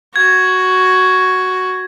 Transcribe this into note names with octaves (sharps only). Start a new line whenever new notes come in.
F#4 G#6